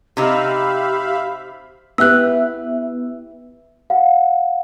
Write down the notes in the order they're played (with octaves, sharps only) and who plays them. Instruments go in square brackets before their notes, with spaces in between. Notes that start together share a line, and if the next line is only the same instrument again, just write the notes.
[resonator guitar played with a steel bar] C3 D#4 [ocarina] G4 [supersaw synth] E5 F5 B5
[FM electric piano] B3 E5 [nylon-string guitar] E4 G4 B4 [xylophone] E6 F#6
[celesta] F5 F#5